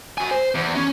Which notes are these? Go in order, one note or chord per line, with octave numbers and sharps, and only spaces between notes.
F#4 G#5
C5
E2
C#4